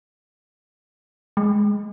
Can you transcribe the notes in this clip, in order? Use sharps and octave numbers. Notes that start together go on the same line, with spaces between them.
G#3